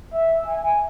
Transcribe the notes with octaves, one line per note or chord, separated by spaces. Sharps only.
E5
G#5